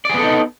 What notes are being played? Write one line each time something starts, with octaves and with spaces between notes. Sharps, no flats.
B3 D#4 G#4 A4 D5